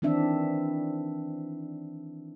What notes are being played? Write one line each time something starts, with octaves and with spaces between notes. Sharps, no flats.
D#3 E3 C4 D4 E5